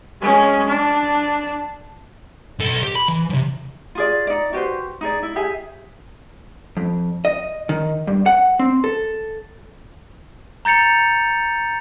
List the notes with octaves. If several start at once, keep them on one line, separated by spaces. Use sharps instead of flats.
G#3 C#4
D4
B1 A4
G4
B5
E3
C3 F3
F4 G#4 D5
D#4 D5
F#4 G4 B4 C5
D#4 G#4 D5
E4
G4 G#4 E5 G#5
F2
D#5
D#3
G2
F#5
C4
A4
A#5 G6 A6 C#7 F7